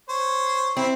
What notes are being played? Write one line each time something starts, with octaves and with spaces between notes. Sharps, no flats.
C5 C#5
C4 E4